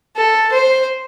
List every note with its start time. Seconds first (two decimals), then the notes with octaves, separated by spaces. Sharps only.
0.17 A4
0.53 C5